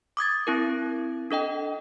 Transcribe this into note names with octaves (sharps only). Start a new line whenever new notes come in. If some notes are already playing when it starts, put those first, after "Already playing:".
D6 D#6 G#6 A6
C4 E4 A#4
D4 A4 D#5 G5